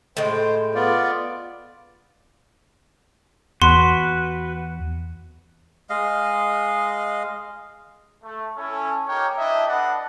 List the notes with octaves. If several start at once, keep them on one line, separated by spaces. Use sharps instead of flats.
A2 G#3 C5 G5
B3 F4 D5
E2 F#4 B4 C6
G#3 D#5 F5
A3
C#4 E4 A4
A#3 D#4 G4 A#4 C#5 G5
D4 E4 G4 D#5 E5
D4 A4 B4 D5 D#5 F#5